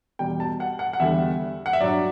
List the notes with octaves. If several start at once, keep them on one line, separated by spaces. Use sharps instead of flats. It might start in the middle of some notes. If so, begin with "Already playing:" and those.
E2 B2 G3 G5
A5
F#5
F#5
F#5
E2 D3 G3 E5
F#5
E5
G2 F#3 D5